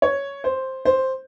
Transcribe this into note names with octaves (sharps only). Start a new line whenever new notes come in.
C#5
C5
C5